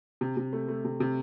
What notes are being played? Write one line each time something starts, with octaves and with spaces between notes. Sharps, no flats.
C3
C3
A3
A3
C3
C3